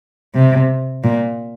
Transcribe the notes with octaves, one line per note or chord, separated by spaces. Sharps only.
C3
A#2